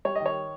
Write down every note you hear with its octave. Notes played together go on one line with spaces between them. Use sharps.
G3 C#5
D#3 D#5
C#5